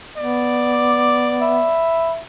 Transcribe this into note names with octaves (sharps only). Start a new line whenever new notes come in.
B3 D5
D6
E5 B5